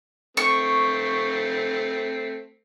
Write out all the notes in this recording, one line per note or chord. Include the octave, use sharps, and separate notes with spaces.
A3 C4 C#6